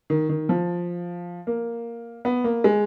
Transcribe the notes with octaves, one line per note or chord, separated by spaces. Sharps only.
D#3
D#3
F3
A#3
B3
A#3
G#3